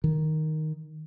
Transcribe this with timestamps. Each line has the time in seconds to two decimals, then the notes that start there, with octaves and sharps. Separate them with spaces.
0.04 D#3